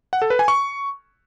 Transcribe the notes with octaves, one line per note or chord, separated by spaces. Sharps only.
F#5
A4
B4
G#5
C#6